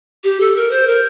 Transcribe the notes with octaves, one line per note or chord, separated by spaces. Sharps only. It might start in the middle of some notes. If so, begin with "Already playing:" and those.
G4
A4
A#4
C5
A#4